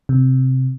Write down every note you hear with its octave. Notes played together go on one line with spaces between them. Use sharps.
C3